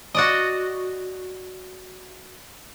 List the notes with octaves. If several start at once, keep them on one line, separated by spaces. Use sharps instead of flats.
F#4 D5 D#5